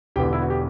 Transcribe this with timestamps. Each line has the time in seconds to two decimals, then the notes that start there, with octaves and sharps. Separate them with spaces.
0.16 E1 E2 D3 G4 G5
0.33 E4
0.41 F#4
0.50 G4